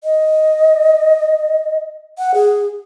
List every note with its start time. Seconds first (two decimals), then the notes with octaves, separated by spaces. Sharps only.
0.04 D#5
2.18 F#5
2.34 G#4